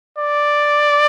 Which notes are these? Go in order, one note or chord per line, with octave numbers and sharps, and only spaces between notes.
D5